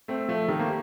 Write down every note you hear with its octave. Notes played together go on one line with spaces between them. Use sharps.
A3 C4
F3 A3
D#3 G3
A#3